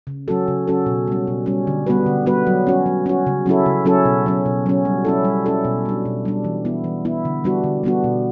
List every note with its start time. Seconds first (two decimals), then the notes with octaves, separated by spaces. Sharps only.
0.07 C#3
0.28 F#3 C#4 F#4 A4
0.48 C#3
0.67 F#3 C#4 F#4 A4
0.86 B2
1.07 G3 C#4
1.27 B2
1.46 G3 C#4
1.67 D3
1.87 G3 B3 F#4 B4
2.06 D3
2.26 G3 B3 F#4 B4
2.47 F#3
2.67 C#4 F#4
2.86 F#3
3.06 C#4 F#4
3.27 C#3
3.46 F#3 C#4 E4 A4
3.66 C#3
3.85 F#3 C#4 E4 A4
4.05 B2
4.26 F#3 C#4
4.46 B2
4.66 F#3 C#4
4.85 G3
5.05 C#4 E4 A4
5.25 G3
5.46 C#4 E4 A4
5.64 B2
5.85 G3 D4
6.05 B2
6.25 G3 D4
6.44 E3
6.65 B3 E4
6.84 E3
7.05 B3 E4
7.25 D3
7.44 G3 B3 D4 F#4
7.64 D3
7.84 G3 B3 D4 F#4
8.04 B2